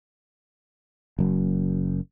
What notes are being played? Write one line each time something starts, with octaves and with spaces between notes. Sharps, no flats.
F#1 F#2